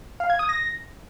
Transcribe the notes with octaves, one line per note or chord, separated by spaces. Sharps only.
F5
G#6
D#6
A#6